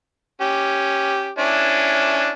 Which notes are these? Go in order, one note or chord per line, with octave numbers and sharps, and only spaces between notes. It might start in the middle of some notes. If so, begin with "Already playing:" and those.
C#4 G4
C#4 D4 E4